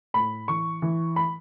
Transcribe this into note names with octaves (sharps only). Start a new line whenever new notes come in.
A2 B5
E3 C#6
E3
B5